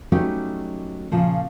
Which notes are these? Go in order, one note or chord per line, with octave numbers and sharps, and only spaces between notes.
F#3 G3 A3 C#4 D#4 G4
A#2 C#3 F3